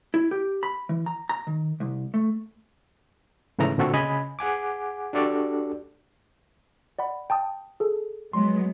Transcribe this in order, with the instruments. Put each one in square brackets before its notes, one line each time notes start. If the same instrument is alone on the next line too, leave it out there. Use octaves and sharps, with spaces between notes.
[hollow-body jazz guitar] E4
G4
B5
E3
A#5
A#5
D#3
C2
A3
[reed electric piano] G#2 C#3 E3 A3 A#5
A#2 D3 C4 F#4 A4
C#3 D#5 G#5 B5
G#4 F#5 G#5 D6
D4 F#4 G4 A4 D5
[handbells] D5 F#5 B5
G5 A5 D#6
G#4 A4
[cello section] F#3 G#3 B3 [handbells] C6